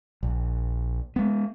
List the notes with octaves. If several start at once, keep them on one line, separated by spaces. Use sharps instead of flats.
A#1
G#3 B3